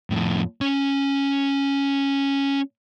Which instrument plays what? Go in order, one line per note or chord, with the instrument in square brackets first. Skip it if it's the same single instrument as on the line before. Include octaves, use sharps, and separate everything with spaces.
[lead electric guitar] F2 A2
C#4 G#5